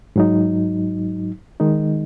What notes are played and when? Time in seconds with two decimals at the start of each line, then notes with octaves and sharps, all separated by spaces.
0.16 G#2 F#3 D#4
1.60 D#3 G#3 D#4